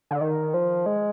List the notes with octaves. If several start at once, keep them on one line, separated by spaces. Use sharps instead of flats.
D3
D#3
F3
G#3